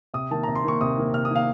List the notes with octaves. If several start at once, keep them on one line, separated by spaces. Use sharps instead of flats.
C3 D#6
D#3 A#3 A5
C3 A#5
C6
D#3 A#3 C#6
C3 D#6
D#3 A#3
C3 F6
D#6
D#3 A#3 F5